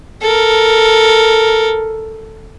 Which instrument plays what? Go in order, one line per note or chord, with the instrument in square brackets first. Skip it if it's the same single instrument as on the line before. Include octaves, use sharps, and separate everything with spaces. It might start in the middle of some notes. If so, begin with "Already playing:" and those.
[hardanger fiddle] A4 A#4